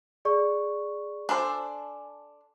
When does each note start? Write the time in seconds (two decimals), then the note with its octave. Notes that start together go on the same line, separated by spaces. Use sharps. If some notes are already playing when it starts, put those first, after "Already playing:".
0.25 G#4 D5 C#6
1.29 D4 A4 C5 G#5